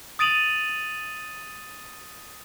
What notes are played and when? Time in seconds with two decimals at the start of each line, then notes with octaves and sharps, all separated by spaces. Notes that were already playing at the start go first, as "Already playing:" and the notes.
0.19 D#6 A6 D7 D#7 F7 F#7